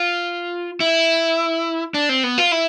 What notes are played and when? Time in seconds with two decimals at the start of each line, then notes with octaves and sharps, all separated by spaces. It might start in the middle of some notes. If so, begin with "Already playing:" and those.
Already playing: F4
0.80 E4
1.94 D4
2.09 C4
2.24 B3
2.38 F4
2.52 E4